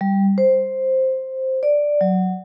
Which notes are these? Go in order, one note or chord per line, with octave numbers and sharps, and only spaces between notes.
G3
C5
D5
F#3